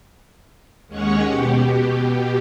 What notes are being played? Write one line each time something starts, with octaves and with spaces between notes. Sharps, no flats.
D#2 G#3 C#4 C#5 F#5 C#6
B2 G4